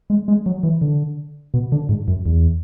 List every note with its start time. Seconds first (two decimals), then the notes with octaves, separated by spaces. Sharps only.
0.10 G#3
0.28 G#3
0.46 F#3
0.63 E3
0.81 D3
1.54 B2
1.72 D3
1.89 G#2
2.08 F#2
2.26 E2